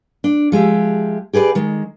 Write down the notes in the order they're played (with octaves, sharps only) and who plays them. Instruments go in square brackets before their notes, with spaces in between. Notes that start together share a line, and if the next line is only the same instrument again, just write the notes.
[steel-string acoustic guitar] D4
F3 G#3 G4 E5
G4 G#4 B4 C5 D5
D#3 G#3